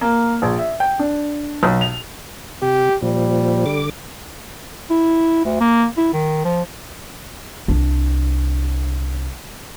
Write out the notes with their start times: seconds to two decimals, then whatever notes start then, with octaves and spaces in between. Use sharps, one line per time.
0.01 A#3
0.42 A#1
0.59 E5
0.80 G5
0.99 D4
1.63 B1
1.81 F7
2.62 C3 G4
3.02 A#2 F3 G3
3.66 D3 D6
4.91 E4
5.45 D2
5.61 A#3
5.97 E4
6.13 D#3
6.45 F3
7.68 C2 D4